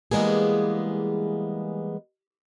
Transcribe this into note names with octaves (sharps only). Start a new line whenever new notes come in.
E3 G3 G#3 A#3 B3 G#4